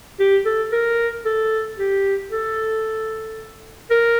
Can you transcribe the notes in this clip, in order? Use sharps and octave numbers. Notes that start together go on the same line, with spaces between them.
G4
A4
A#4
A4
G4
A4
A#4